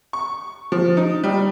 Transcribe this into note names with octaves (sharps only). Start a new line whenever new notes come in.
C#6
F3
D#4
G3